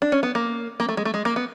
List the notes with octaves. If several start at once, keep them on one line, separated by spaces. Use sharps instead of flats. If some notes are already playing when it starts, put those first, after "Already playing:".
D4
C#4
B3
A#3
A#3
A3
G#3
A3
G#3
A#3
B3